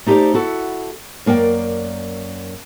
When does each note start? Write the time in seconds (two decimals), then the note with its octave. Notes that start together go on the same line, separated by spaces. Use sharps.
0.06 A3 D#4 G4 B4 C5 D5
0.34 E4 F#4 A4
1.26 F#2 A#3 D5 G5